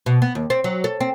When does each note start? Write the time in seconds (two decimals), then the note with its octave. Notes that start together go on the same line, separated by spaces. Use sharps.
0.06 B2
0.22 B3
0.35 D#2
0.50 C4
0.64 F#3
0.84 A4
1.00 C4